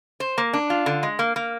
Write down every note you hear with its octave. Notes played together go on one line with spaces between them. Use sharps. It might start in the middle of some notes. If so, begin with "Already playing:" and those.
C5
A#3
D4
F4
D3
G#3
A#3
A#3